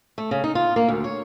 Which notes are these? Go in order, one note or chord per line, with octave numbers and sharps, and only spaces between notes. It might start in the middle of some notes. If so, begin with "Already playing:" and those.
A3
C#3
D#4
F4
A#3
D2
C#5